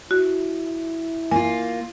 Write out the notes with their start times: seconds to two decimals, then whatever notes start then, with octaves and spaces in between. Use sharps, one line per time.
0.11 E4 F#4
1.31 A#3 F4 G#5